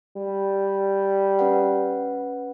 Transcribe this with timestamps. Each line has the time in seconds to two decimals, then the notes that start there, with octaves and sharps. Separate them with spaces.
0.17 G3
1.39 C#4 B4 F#5